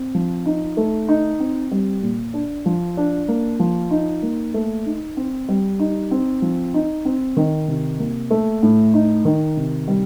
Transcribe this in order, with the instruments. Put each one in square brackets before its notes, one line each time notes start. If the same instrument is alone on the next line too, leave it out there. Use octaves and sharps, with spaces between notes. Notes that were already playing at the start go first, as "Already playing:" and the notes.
Already playing: [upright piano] C4
F3
D#4
A3
D#4
C4
G3
A#2
D4
F3
D4
A#3
F3
D#4
A#3
A3
D#4
C4
G3
D#4
C4
F3
D#4
C4
D#3
C3
A#3
A3
A2
D#4
D#3
C3
G3